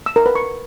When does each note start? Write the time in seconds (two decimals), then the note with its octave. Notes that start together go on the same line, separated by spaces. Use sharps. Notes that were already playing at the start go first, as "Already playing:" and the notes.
0.06 E6
0.16 A#4
0.26 B4
0.35 C#6